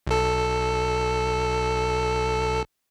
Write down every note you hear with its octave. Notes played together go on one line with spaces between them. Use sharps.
B1 A4